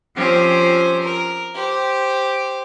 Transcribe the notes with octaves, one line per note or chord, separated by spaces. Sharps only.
F3 C4 C#4 G4 C5
A#4
G4 C5